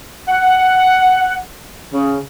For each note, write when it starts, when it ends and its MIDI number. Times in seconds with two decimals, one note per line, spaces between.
0.29 1.37 78
1.94 2.20 49